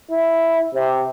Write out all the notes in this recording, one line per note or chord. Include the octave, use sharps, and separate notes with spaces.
E4
C3